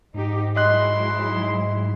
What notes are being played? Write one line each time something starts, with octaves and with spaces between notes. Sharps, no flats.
G#2 D#4 G4
F#3 G#3 E4 D#5 C6 F#6